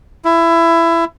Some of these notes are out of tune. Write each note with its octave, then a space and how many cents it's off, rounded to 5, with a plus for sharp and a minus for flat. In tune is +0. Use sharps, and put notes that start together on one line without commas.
E4 +20